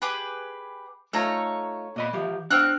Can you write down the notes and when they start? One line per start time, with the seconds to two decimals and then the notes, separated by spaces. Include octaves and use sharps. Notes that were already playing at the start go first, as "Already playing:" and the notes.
0.02 G4 G#4 B4
1.13 A3 D#4 F4 A4 C#5 A#5
1.96 A#2 D#5 B5
2.13 E3 F3 G4
2.50 C4 D4 F#5 G5 F6 F#6